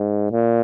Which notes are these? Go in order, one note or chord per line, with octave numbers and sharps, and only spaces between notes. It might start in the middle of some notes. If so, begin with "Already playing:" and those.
Already playing: G#2
A#2